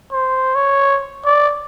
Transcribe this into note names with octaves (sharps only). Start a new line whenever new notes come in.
C5
C#5
D5